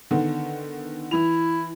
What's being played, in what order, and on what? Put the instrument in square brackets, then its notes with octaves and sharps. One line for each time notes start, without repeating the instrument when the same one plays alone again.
[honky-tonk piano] D3 D#3 B3
[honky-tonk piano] E3 F7 [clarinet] E4